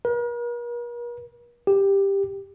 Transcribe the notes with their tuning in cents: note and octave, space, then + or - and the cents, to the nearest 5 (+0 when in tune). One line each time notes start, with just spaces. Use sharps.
A#4 +45
G4 +10